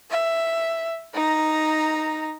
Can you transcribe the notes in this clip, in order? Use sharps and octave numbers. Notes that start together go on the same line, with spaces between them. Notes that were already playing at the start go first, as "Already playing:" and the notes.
E5
D#4 A#5